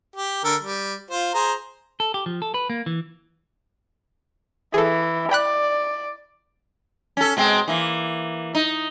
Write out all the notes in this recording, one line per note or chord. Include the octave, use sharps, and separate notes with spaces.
G4
D3 A4 A#4
G3
F4 C5
G#4 C5 A#5
A4
G4
F3
A4
B4
A#3
E3
E3 G#4 A4
D5 G5 B5 F#6
C#4 A4
B2 G#3 C4
E3 A#3
D#4